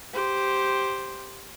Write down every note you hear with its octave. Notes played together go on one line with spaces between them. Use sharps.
G4 C5